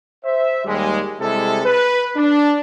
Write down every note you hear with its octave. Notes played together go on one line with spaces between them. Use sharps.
C5 E5
D#2 G3 G#3
C3 G3 G#3 E4 G#4 A4
B4
D4